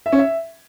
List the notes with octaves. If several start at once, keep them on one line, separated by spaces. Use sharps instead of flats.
E5
C#4
E5